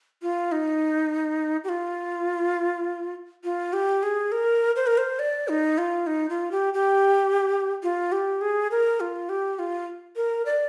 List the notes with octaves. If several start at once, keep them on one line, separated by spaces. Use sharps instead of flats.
F4
D#4
G4
F4
F4
G4
G#4
A#4
C5
A#4
C5
D5
D#4
F4
D#4
F4
G4
G4
F4
G4
G#4
A#4
F4
G4
F4
A#4
D5